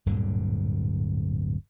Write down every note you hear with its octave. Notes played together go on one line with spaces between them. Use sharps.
D1 G2 A#2 D3